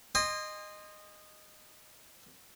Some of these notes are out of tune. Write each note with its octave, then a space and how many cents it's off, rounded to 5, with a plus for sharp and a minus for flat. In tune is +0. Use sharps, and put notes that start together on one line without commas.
D#5 -15 G#5 -45 C6 +0